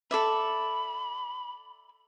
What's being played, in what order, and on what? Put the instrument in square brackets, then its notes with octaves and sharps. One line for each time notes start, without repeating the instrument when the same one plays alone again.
[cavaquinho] A4 D5 E5 [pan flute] B5